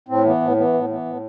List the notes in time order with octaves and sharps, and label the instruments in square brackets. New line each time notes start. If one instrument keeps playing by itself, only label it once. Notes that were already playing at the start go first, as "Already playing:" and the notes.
[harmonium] A2 C4
E3 B3
A2
E3 B3
A2
E3 B3
A2